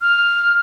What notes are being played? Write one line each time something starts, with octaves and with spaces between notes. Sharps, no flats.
F6